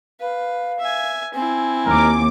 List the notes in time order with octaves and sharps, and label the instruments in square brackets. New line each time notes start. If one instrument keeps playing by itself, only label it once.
[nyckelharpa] B4 [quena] F5
[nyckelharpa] E5 G#5
[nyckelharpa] C4 E4 [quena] G#5
[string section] D#2 D6 [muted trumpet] A#4